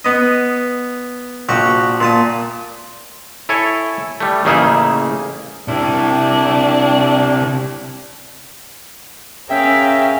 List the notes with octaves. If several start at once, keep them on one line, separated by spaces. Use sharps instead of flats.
B3 D#5
A#1 F#4 G4 C#6
A#2 A5 D#6
E4 A4 C#5 G#5
G3 A3
A1 C#3 A#3 D#4 G#4 E5
C3 D4 E4
C#4 G#4 A#4 E5 F5 G5